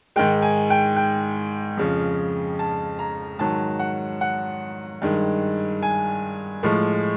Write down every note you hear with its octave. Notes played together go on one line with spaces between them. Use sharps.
G#2 D#3 G#3 G5
G#5
G5
G5
F2 C#3 F3
A5
A#5
G#2 D#3 F#3 A5
F#5
F#5
G2 D#3 G#3
G#5
A2 F3 G#3